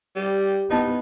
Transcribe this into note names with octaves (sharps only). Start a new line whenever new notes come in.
G3 G4
B3 D#4 E4 D#5 A5